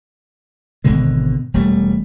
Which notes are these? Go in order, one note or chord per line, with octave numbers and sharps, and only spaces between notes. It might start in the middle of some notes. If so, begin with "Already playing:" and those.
G#1 B2 D3 G#3
E1 G3 A3